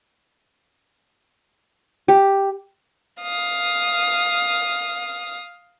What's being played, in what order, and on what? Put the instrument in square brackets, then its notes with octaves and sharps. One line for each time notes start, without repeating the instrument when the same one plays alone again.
[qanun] G4
[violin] F5 D#6